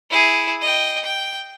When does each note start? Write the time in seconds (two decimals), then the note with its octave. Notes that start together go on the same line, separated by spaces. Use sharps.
0.11 E4 G#4
0.62 D#5 G5
1.04 G5